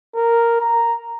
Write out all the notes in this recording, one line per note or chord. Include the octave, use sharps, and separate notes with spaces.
A#4
A#5